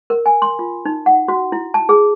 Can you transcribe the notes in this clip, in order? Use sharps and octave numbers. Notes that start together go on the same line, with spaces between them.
A#4
G#5
C6
F4
D#4
F#5
F#4
E4
A5
G#4